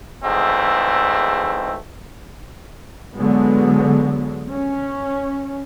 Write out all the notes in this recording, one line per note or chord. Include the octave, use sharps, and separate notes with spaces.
E2 G#2 B2 A3 C4
D3 F#3 G#3 B3
C#4